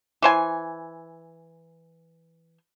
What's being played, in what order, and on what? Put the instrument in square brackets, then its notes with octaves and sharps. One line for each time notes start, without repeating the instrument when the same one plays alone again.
[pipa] E3 C5 G#5